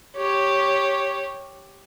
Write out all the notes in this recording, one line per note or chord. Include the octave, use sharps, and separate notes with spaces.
G4 C#5